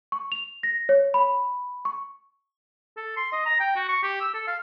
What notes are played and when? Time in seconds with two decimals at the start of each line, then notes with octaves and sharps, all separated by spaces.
0.12 C#6
0.32 F7
0.63 A#6
0.89 C#5
1.14 B5
1.85 C#6
2.96 A4
3.17 C6
3.32 D#5
3.45 A#5
3.60 G5
3.76 F#4
3.88 C#6
4.03 G4
4.20 E6
4.34 A4
4.47 F5